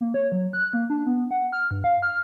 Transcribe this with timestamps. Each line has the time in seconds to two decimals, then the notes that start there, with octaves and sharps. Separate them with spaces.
0.01 A#3
0.14 C#5
0.32 F#3
0.53 F#6
0.73 A#3
0.90 D4
1.07 B3
1.31 F#5
1.52 F6
1.71 G2
1.84 F5
2.02 F6